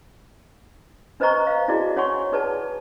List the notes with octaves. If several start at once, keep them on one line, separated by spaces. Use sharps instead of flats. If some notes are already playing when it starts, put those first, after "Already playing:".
D4 B4 C5 D#5 A#5 C#6
C5 F5
D#4 E4 F#4 G#4 D5
D4 C#5 F#5 G#5 C6 C#6
D#4 G#4 B4 D5 A5